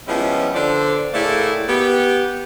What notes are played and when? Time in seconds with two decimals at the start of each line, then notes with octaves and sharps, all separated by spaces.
0.08 F3 G3 G#3 B3 C#4 E4
0.55 D3 C5 D5
1.14 A2 A3 A#3 E4 G#4 D5
1.69 B3 G4